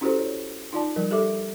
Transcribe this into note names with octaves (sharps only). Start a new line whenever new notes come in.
C#4 E4 F#4 G4 A4 C5
C#5
D#4 F4 D5 A5
F3 G3 A#4
G4 A4 E5 D6